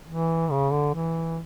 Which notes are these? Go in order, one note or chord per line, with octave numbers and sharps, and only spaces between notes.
E3
C#3
D3
E3